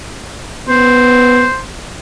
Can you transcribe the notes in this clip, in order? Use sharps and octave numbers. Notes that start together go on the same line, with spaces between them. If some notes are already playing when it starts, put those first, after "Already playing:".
B3 C5